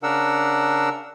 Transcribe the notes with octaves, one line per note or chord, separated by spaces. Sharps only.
C#3 D4 A#4 F#5 E6